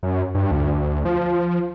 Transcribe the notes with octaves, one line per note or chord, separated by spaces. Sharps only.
F#2
G2
D2
F3